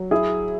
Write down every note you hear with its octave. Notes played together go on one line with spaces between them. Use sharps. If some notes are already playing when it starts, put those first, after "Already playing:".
Already playing: F#3
E4 G#4